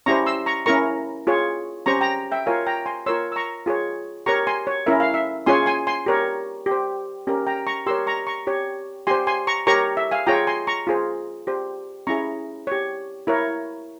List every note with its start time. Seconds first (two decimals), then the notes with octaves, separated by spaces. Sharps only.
0.06 C#4 E4 G4 C5 A#5 C#6
0.26 C6 E6
0.46 A#5 C#6
0.66 C#4 E4 A#4 A#5 C#6
1.27 F4 G#4 C#5
1.86 C#4 G4 C5 A#5 C#6
2.01 G5 A#5
2.32 E5 G5
2.46 F4 A#4 C#5 F5 G#5
2.67 G5 A#5
2.86 G#5 C6
3.06 F4 A#4 C#5 C6 E6
3.32 E6
3.36 A#5 C#6
3.66 F4 G#4 C#5
4.26 G4 A#4 C#5 A#5 C#6
4.47 G#5 C6
4.67 C#5
4.86 C#4 E4 A#4 E5
5.00 F5
5.14 E5
5.46 C#4 F4 G#4 C#5 G#5 C6
5.66 G#5 C6
5.87 G#5 C6
6.06 G4 A#4 C#5
6.66 G4
6.71 C5
7.27 C#4 G4 A#4
7.47 G5 A#5
7.67 A#5 C#6
7.86 G4 A#4 C#5 C6 E6
8.07 A#5 C#6
8.27 A#5 C#6
8.47 G4 C#5
9.07 G4 C5 G#5 C6
9.27 G#5 C6
9.47 A#5 C#6
9.67 G4 A#4 C#5 A#5 C#6
9.97 E5
10.11 F5 G#5
10.27 F4 G#4 C#5 G5 A#5
10.47 G#5 C6
10.67 A#5 C#6
10.87 F4 G#4 C5
11.47 G4 C5
12.07 C#4 E4 G#4 A#5 C#6
12.67 G4 C#5
13.27 E4 A#4 C#5